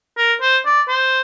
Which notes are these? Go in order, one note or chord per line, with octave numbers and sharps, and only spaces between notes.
A#4
C5
D5
C5